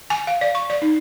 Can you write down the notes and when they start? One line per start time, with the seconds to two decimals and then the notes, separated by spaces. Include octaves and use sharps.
0.10 G#5
0.27 F5
0.41 D5
0.55 C#6
0.70 D5
0.82 D#4